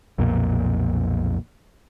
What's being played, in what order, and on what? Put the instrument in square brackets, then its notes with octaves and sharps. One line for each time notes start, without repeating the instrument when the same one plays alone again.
[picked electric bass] B1 F2 A#2